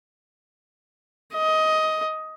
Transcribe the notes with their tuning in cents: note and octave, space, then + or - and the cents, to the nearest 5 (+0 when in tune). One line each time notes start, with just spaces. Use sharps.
D#5 +15